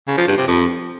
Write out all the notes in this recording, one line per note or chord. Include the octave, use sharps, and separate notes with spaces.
C#3
F3
G2
C3
F2